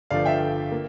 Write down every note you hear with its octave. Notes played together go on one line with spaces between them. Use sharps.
G1 G2 F3 A3 D5 F5
E5 G5
A#3